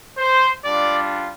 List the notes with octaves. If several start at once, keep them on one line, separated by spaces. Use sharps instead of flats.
C5
G3 D4 F4 D5